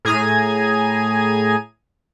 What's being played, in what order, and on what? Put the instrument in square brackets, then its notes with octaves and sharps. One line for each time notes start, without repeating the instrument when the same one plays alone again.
[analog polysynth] A2 G#4 G#5 A#5 G#6 D#7